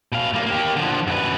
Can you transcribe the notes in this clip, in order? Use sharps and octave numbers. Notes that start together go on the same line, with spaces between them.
B2 F5
G3 A#3
A#3 G4
D3 F3
F#2 B4